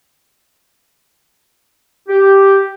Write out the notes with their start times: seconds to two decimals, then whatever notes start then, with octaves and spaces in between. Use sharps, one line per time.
2.09 G4